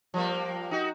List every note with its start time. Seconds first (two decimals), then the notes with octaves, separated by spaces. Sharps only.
0.14 F3 G3 A#3
0.71 D#4 F#4